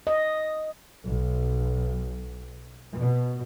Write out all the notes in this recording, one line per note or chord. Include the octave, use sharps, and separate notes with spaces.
D#5
B1
B2